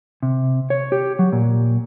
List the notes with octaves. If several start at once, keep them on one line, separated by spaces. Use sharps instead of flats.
C3
C#5
G4
F#3
A#2